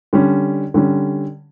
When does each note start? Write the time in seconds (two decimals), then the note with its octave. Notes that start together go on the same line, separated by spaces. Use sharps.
0.13 D3 G3 C#4
0.74 D3 G3 C#4